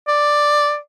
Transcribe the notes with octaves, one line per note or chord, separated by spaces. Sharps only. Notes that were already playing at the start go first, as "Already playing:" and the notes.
D5